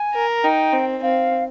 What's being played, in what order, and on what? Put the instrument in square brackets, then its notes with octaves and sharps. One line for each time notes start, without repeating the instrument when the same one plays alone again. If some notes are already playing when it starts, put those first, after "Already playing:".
Already playing: [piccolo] G#5
[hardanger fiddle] A#4
[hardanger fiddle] D#4 [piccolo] G5
[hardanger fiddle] C4
[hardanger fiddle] C4 [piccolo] F5